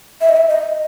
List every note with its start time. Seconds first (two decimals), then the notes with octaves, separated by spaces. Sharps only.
0.21 E5
0.29 D#5
0.37 E5
0.49 D#5